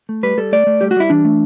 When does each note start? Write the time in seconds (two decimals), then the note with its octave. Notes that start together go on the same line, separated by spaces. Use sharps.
0.09 A3
0.23 G3 B4
0.38 G3 A4
0.52 A3 D5
0.67 A3
0.81 G3 G4
0.91 F#4
0.96 G3 E4
1.10 E3 D4
1.25 A3